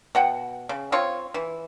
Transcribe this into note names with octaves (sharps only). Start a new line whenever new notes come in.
B2 F#5 G5
C#3
C4 F4 C#5
E3